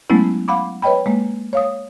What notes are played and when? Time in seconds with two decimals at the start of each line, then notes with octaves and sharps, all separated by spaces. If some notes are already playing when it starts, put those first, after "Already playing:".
0.10 F#3 G#3 A3 B3 C#4 E4
0.48 F5 F#5 B5 D6
0.82 B4 C#5 D#5 G5 B5
1.06 G#3 A#3
1.53 C#5 F5 D#6